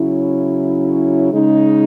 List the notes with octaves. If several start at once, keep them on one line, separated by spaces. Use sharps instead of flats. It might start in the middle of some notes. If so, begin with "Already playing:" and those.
Already playing: C#3 F#3 C#4 E4
C#3 G#3 D#4